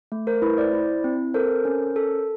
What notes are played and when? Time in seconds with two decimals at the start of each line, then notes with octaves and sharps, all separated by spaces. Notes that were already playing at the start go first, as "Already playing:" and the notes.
0.12 A3
0.27 A#4 C5
0.42 E4 B4
0.58 C5 D5
0.74 E4
1.04 C4
1.34 A4 A#4 C5
1.65 C#4
1.96 A4